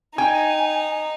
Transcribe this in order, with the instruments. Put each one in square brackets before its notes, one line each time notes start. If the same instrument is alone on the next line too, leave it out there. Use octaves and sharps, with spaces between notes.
[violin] D#4 [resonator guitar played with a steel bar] G5 [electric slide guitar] G#5